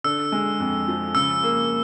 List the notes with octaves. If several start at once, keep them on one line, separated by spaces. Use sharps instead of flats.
D3 E6
G#3
F2
F3
C#3 E6
A#3